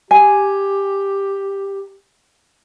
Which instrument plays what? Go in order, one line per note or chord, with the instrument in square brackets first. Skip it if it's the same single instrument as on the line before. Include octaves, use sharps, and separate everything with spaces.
[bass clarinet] G4 [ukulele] G#5